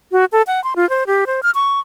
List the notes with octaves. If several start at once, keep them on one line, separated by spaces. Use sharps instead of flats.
F#4
A4
F#5
C6
F4
C5
G4
C5
F6
C#6